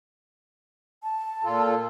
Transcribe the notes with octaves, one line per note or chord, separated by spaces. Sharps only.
A5
A#2 F4 A4